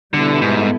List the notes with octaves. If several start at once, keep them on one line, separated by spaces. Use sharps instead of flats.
B2 D3 G3 B3 E4 A4
G#2